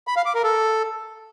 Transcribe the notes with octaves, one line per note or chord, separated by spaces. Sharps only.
B5
F5
D6
A#4
A4